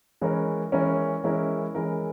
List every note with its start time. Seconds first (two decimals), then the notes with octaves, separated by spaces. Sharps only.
0.21 E3 G#3 C#4 E4 A#4
0.72 E3 G#3 C#4 E4 A#4
1.24 E3 G#3 C#4 E4 A#4
1.75 E3 G#3 C#4 E4 A#4